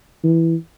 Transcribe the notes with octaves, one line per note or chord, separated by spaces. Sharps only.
E3